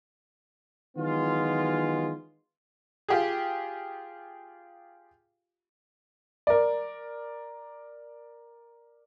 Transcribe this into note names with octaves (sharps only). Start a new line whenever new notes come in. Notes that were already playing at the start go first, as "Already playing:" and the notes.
D#3 E3 F#3 G#3 B3 F4
F4 G4 G#4
A#4 D5